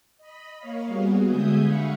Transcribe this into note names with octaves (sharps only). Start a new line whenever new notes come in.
D#5 B5
A#3 C#5 F5
G3 B3 F#4 G#4
D3 G#3 E5 G#5 D#6 G6
F5 F#5 B5 C#6